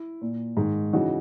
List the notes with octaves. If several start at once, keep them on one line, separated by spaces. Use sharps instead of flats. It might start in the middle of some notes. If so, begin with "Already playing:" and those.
Already playing: E4
A#2
G#2 D#3
C#3 E3 D#4 F#4